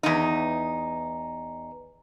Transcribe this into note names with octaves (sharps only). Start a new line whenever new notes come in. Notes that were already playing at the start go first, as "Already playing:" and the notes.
E2 D#4